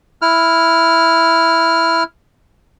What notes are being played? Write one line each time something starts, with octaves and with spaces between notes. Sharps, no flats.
E4 F6